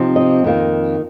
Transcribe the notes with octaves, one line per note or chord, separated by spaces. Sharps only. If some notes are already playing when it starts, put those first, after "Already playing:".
Already playing: C3 F3 C4 D#4
D#5
F2 D#3 A#3